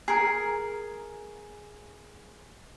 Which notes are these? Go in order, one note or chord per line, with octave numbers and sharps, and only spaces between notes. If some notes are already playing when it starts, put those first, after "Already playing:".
G#4 A#4